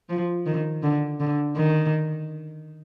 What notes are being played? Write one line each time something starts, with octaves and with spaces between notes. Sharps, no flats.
F3
D#3
D3
D3
D#3